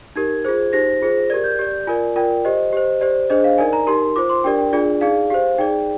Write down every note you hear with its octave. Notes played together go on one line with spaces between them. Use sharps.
D#4 G4 A#4 G#6
F4 G#4 C5
D#4 G4 C5 A#6
F4 G#4 C5
G4 A#4 D5 G#6
G6
G4 D5
F4 A#4 D5 G#5
F4 A#4 D5 G5
G4 C5 D#5
G4 C5
G4 C5 D5
D4 G#4 C5 D#5
F5
D#4 A#4 D5 G#5
A#5
D#4 G4 A#4 C6
F4 C5 D6
C6
D4 G4 A#4 D5 G5
G5
D4 F4 G#4 D5
D#4 G#4 D5 F5
G4 C5 F5
D#4 G#4 D5 G5